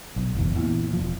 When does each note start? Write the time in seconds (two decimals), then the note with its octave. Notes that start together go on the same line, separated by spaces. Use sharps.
0.16 B1
0.35 F#1 E2
0.55 E2 A#2
0.93 E1 F3